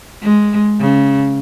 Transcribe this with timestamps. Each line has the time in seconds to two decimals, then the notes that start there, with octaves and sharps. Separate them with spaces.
0.22 G#3
0.80 C#3